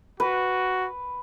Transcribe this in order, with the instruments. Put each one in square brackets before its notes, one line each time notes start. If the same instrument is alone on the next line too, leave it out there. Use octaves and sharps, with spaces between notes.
[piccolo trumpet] F#4 [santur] B4